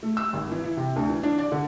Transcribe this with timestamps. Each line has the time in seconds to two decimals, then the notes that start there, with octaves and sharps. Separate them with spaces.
0.03 A3
0.17 E6
0.33 G#1
0.51 E3
0.64 E4
0.77 C3
0.96 D2
1.10 E3
1.24 D4
1.38 D5
1.52 D3